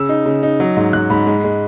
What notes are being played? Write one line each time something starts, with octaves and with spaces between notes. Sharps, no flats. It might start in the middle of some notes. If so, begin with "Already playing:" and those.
Already playing: C#3 E6
D#4
C#3
D#4
F#3
G#2
G#2 F#6
G#2 B5
G#3
G#3